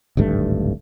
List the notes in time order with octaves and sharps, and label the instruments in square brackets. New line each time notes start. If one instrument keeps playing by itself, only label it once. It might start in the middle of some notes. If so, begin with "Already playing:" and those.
[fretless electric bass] D1 G#1 G2 A3